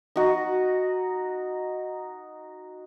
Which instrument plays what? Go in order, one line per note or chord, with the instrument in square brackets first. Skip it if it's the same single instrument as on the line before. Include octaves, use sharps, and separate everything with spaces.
[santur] D#4 F#4